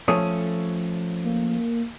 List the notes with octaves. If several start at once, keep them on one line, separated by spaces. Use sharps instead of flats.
F3 A3 C#4 A4 C#5 D#6
A#3